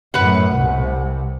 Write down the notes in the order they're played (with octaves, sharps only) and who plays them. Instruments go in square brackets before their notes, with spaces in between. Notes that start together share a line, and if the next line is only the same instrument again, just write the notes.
[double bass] F#2 A2 [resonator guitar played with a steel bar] B4 F#5
[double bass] C2 C3